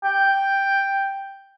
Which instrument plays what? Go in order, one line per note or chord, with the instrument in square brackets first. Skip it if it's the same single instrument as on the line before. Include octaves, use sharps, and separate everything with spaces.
[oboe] G5